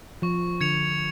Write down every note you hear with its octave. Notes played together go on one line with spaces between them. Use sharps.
F3 C#6
D3 G#6 C#7 F7